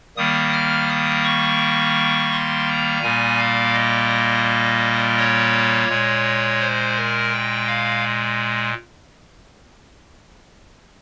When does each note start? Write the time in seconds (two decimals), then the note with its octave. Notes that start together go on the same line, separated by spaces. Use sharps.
0.17 D#3 G3 A#3 D#6
0.53 F6
0.89 D#6
1.24 C#6
2.32 C6
2.67 A#5
3.02 A#2 G3 A#3 G#5
3.38 F5
3.74 D#5
5.18 C#5
5.88 A#2 G#3
6.60 C5
6.95 A#4
7.32 G5
7.67 F5